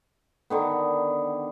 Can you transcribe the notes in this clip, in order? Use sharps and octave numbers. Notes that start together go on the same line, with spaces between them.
D3 D#3 B3